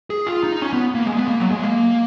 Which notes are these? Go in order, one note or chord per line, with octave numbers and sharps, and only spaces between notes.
G#4
F4
D#4
C#4
B3
A#3
G#3
B3
A#3
F#3
G#3
A#3